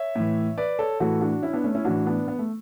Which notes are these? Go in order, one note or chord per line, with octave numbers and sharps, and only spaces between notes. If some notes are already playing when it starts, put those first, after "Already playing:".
Already playing: C#5 E5
A2 E3
B4 D5
A4 C#5
A2 E3 F#4 A4
D4 F#4
C#4 E4
B3 D4
A3 C#4
C#4 E4
A2 E3 D4 F#4
B3 D4
B3
A3